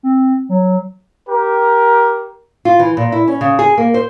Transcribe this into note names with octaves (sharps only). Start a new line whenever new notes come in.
C4
F#3
G4 A#4
F4
E3
A#2
E4
C#4
C#3
G#4
A#3
C5